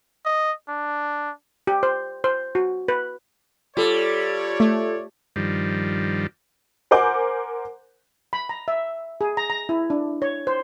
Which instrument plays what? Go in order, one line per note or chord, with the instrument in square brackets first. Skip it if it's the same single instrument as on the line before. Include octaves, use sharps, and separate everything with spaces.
[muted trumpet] D#5
D4
[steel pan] G4
C5
C5
F#4
B4
[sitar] G3 [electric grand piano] F4 A4 [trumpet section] C#5 D5
[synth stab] A3
[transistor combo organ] G2 D#3 F3 G3
[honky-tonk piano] A#4 C5 F#5 G#5 D6 G6
[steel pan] B5
A#5
E5
G#4
A#5
A#5
E4
D4
C#5
C5